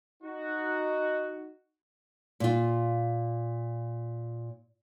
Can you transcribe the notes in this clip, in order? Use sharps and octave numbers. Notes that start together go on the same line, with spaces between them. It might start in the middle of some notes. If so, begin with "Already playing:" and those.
D#4 F#4
A#2 F4